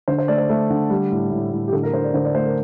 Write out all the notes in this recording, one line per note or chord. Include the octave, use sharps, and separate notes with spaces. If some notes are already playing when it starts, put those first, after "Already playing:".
D3 C5
C5
A3 D5
C5
A3
D3
G3
A2
A2
A2
G4
D3 A4
A#4
D3 C5
D5
D3 C5
D5
A3 C5
A#4